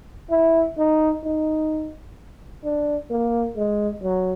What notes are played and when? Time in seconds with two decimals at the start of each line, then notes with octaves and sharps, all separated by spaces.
0.31 E4
0.78 D#4
1.24 D#4
2.64 D4
3.10 A#3
3.57 G#3
4.03 F#3